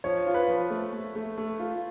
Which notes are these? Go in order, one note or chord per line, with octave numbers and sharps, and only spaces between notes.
F3 C#5
F4
B4
F3
A3
A3
A3
A3
F4